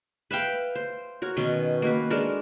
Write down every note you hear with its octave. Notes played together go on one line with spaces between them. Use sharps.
B4 E5 F5 G5
C5
F#4 A#4 C#5
B2 D#3 C#4
A#3 F#4 B4
G#3 D4 A4 A#4